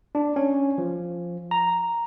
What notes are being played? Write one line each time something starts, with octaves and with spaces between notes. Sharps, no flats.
D4
C#4
F3
A#5